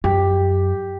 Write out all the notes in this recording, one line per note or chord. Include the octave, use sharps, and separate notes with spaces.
F#2 G4